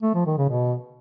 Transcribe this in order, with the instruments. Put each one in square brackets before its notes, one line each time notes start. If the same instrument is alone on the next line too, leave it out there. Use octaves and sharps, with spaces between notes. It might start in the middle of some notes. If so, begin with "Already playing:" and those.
[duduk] A3
F3
D#3
C#3
B2